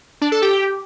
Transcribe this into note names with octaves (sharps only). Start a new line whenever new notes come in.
D4
A4
G4